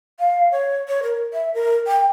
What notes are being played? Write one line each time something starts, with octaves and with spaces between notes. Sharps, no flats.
F5
C#5
C#5
A#4
E5
A#4
G5